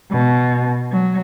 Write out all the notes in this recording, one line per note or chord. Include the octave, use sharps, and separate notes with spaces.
B2
F#3